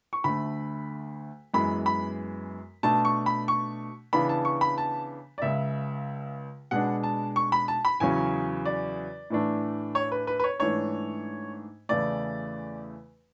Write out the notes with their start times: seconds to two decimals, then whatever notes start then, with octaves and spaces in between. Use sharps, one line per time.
0.13 C#6
0.24 D2 D3 A3 B5
1.54 F#2 E3 G#3 B3 B5
1.86 B5
2.83 B2 A3 D4 A5
3.05 C#6
3.26 B5
3.48 C#6
4.13 C#3 E3 B3 D4 B5
4.29 A5
4.45 C#6
4.61 B5
4.78 A5
5.38 D5
5.42 C#2 C#3 G#3 E5
6.71 B2 G#3 B3 D4 F#5
7.03 A5
7.36 C#6
7.52 B5
7.68 A5
7.85 B5
8.00 E2 C#3 F#3 C#4 G#5
8.65 D5
9.30 A2 E3 A3 D4
9.95 C#5
10.12 B4
10.27 B4
10.39 B4
10.44 C#5
10.60 G#2 E3 A3 D4 C#5
11.89 E2 C#3 E3 A3 D5